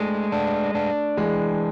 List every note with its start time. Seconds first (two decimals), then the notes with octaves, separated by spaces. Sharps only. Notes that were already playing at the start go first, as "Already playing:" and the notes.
Already playing: G#3 A3 D4
0.32 D4
0.75 D4
1.17 E3 G#3